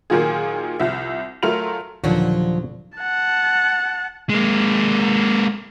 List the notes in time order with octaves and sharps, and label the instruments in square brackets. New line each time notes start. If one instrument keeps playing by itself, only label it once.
[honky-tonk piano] A#2 D#3 F#3 F4 G#4
C2 F3 E5
F#3 A3 F4 A#4 F7
[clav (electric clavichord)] D#2 A#2 D3 [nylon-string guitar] F3 F#3 F#4
[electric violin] F#5 A5
[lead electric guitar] G#3 A#3